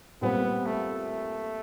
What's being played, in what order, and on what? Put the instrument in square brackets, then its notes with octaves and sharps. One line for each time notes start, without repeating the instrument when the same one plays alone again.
[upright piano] A#2 G3 C4 [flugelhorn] B3
[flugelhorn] A3